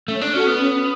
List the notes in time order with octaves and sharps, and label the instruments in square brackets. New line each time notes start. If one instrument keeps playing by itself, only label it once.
[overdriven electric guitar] A3 [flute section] C#4
[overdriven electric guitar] D4
[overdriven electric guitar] C#4 [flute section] F#4 A4
[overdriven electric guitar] B3
[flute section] C#4